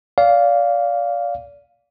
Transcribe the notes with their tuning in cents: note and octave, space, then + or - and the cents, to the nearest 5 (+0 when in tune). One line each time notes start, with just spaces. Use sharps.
D5 -30 F5 +0